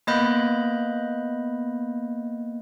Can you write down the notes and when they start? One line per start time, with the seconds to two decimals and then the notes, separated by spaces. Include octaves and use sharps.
0.07 A#3 B3 D#5 B5 F#6 G6